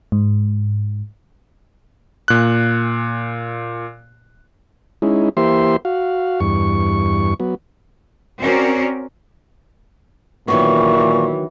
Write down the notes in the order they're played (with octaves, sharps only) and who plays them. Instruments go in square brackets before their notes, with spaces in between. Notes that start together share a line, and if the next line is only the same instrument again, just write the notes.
[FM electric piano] G#2
[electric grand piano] A#2 F#6
[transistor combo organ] G#3 C#4 D#4 E4
E3 A#3 G4 C5 E5 C6
F#4 F5
E2 G2 C#6
F#3 B3
[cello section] C4 C#4 F#4 A#4 D5
[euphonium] A#2 [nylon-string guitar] D#3 F#3 B3 [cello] E3 [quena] C#6